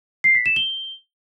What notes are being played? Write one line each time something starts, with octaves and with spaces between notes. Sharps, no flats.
C7
B6
E7
G7